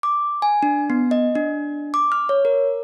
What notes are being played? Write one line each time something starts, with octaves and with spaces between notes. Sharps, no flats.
D6
G#5
D4
B3
D#5
D4
D6
F6
C#5
A#4